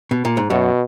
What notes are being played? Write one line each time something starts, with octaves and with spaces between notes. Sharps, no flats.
B2
A#2
G#2
F#2 B2